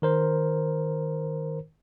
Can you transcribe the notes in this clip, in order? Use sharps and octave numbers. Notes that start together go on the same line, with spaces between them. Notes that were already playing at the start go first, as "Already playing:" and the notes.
D#3 A#4 C5